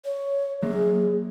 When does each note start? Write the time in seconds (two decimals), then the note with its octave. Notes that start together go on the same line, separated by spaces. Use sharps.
0.05 C#5
0.62 F#3 A#3 G#4